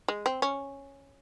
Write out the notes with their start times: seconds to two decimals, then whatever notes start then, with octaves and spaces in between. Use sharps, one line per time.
0.08 G#3
0.26 C4
0.42 C#4